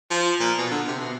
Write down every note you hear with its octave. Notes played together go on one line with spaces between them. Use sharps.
F3
A#2
B2
D3
C3
B2